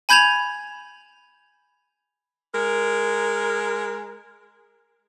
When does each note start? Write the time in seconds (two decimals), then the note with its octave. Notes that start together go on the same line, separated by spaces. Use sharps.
0.09 G#5 B5 G6 G#6 E7 F7
2.54 G#3 A#4